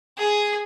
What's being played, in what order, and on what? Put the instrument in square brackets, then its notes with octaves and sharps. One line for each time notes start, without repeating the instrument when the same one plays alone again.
[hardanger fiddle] G#4